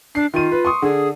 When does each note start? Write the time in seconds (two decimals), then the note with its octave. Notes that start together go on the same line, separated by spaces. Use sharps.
0.15 D4 C7
0.34 D#3 F4 D#7
0.52 B4
0.65 C6 C#6 D#6
0.82 D3 G#4